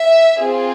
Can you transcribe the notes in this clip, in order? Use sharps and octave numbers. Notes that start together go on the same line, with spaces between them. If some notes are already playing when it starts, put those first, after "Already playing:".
Already playing: E5
C4 F4 G#4